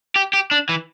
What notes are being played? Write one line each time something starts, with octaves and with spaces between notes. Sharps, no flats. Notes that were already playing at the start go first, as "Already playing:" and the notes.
G4
G4
D4
E3